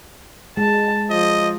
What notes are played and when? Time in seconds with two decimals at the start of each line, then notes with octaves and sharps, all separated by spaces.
0.57 G#3 A5
1.10 F3 D#5